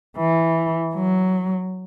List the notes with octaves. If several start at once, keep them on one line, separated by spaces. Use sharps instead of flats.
E3
F#3